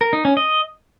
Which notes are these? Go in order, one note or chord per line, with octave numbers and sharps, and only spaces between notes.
A#4
D#4
C#4
D#5